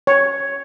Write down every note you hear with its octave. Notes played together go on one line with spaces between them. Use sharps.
C#5